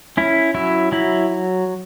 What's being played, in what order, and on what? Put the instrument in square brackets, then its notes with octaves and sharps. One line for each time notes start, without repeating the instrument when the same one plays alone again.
[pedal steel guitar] C#4 E4
F#3 E4
F#3 E4